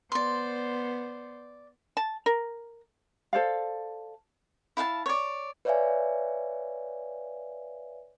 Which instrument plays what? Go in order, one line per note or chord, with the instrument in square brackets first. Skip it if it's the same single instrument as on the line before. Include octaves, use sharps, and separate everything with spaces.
[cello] B3 C5 [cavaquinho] D5 C6
[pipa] A5
A#4
[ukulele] A4 C5 D5 F5
[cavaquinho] E4 F5 F#5 A5
C#5 D5
[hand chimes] B4 C#5 D5 E5 F5 G#5